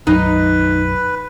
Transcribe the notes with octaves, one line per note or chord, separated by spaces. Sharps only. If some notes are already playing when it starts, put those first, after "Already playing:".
B1 F#2 F#3 D#4 B4